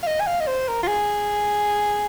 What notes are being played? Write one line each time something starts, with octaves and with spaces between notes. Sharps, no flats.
F5
D#5
G#5
F5
D#5
C5
A#4
F4
G#4